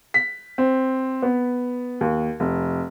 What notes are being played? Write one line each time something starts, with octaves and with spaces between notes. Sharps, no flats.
B6
C4
B3
D#2
F1